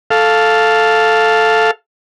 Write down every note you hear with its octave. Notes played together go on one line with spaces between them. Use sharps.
A4 F5